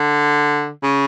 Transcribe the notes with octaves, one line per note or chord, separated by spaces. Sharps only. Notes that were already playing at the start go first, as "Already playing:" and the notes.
Already playing: D3
C#3